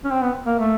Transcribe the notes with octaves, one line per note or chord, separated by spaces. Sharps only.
C#4
C4
B3
A#3
A3